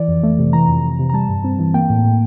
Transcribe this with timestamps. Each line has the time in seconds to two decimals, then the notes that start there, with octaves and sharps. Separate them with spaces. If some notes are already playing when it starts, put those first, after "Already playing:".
Already playing: E3 D5
0.08 F2
0.23 A3
0.39 C3
0.53 E3 A#5
0.68 F2
0.83 F2
0.99 C3
1.10 A#5
1.14 G3 A5
1.29 G2
1.44 C4
1.59 E3
1.74 A#3 G5
1.90 A2
2.04 A2